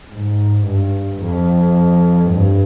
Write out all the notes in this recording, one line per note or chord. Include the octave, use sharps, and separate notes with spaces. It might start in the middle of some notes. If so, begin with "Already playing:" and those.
G#2
G2
F2
G2